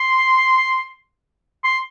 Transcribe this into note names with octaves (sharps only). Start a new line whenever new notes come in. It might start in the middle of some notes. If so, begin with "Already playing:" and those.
Already playing: C6
C6